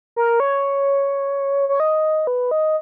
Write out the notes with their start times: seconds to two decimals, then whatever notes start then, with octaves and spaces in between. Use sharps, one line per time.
0.16 A#4
0.40 C#5
1.69 C#5
1.80 D#5
2.27 B4
2.51 D#5